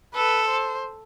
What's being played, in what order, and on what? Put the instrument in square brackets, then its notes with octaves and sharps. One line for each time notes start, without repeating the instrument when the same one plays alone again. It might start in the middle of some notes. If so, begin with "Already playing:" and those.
[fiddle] A4 [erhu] B4
[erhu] C5